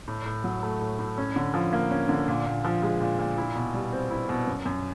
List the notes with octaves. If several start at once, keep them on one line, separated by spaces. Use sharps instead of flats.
A2
A2
F#3
A3
A2
A2
C#4
D3
F3
A#3
C#4
D3
A#2
A#2
F3
G#3
A#2
A#2
E4
B2
G3
C4
E4
B2
F#2
F#2